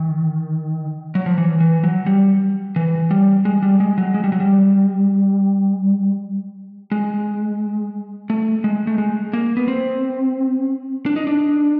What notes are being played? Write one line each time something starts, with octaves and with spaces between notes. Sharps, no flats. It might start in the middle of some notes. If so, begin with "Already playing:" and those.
Already playing: D#3
F#3
F3
E3
E3
F#3
G3
E3
G3
G#3
G3
G#3
F#3
G#3
G3
F#3
G3
G#3
A3
G#3
A3
G#3
A#3
B3
C4
D4
D#4
D4